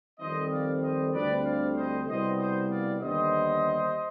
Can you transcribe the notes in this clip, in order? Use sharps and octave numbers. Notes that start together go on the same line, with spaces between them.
F2 D#3 G3 C4 C5 D#5
D5 F5
C5 D#5
D2 D3 G3 C4 B4 D5
D5 F5
C5 D#5
C2 B2 G3 B3 C5 D#5
C5 D#5
D5 F5
D#2 D3 G3 B3 C5 D#5